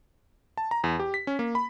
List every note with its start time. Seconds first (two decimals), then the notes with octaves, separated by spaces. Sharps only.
0.57 A5
0.71 A#5
0.84 E2
1.00 G4
1.14 B6
1.27 C#4
1.39 A#3
1.55 B5